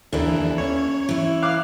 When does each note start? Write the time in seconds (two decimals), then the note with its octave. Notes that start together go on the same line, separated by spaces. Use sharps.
0.12 D#2 E3 A#3 D4 E4 A4
0.58 C#4 C#5
1.09 E3 E4
1.43 F5 D6 F#6